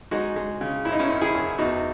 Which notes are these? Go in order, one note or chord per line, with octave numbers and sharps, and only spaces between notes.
G#3 D#4 F#4
G#3
C#3
F#2 E4
D#4
C#4 E4
F#2
E4 G#4
F#2
E2 D#4 F#4